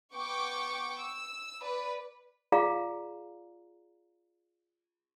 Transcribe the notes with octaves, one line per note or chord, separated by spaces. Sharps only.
B3 G5 C#6 D6 D7
E6
B4 D5
F4 G#4 D5 F5 A#5